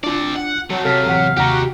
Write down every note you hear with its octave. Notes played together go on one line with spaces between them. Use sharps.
C4 D4 F4 D5
F#5
F#3 A3 C4
C3 A4 F5 A5 B6
A1 F#5 B6
D#2 C3 D#4 F#4 G4 A#5